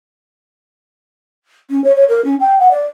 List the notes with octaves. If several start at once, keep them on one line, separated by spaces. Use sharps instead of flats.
C#4
C#5
C#5
A#4
C#4
G5
F#5
D5